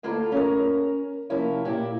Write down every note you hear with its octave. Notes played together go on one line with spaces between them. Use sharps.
D2 A#3 E4 F4 A4 A#5
C#4 A#4
C3 F3 A#3 C#4 E4
A#2 E4 G4